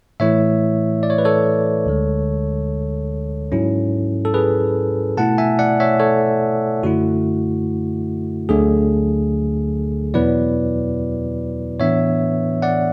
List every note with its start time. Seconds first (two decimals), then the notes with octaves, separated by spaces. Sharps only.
0.20 A2 E3 A3 E4 C#5 E5
1.03 D5
1.10 C#5
1.18 B4
1.25 A4 C#5
1.86 D2 D3 G#3
3.52 G#2 F#3 C#4 E4
4.25 A4
4.34 G#4 B4
5.17 B2 A3 E4 F#5 A5
5.38 E5 G#5
5.59 D5 F#5
5.80 C#5 E5
6.00 A4 C#5
6.83 F#2 D3 A3 E4 F#4
8.49 D2 D3 F#3 A3 D4 G#4
10.14 E2 B2 F#3 B3 E4 B4 D5
11.80 A2 E3 B3 D4 C#5 E5
12.62 D5 F#5